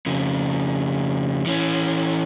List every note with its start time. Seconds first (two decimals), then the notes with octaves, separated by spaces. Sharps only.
0.06 F2 C#3
1.46 E3 C#4